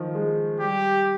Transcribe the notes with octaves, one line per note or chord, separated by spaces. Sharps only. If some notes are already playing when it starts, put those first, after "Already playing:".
Already playing: D#3 F3
G#3
G3 G4